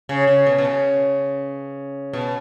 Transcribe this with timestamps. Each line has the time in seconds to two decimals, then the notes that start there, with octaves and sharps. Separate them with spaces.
0.09 C#3
0.27 C#3
0.47 B2
0.58 B2
0.65 C#3
2.13 B2